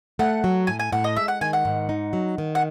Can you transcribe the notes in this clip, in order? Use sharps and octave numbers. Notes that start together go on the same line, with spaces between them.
A3 F#5
F#3
A2 G#5
G#5
A2 F#5
D#5
G#3 E5
F#5
D#3 G#5
F#5
G#2
D#4
F#3
D#3
F#5